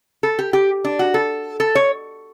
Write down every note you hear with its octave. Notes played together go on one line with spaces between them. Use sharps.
A4
G4
G4
D4
F#4
A4
A4
C#5